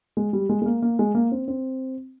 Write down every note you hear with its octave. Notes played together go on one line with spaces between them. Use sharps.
G#3
G3
G#3
G#3
A#3
A#3
G#3
A#3
C4
C4